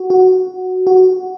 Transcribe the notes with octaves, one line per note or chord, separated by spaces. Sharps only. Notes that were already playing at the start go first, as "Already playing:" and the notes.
Already playing: F#4
F#4
F#4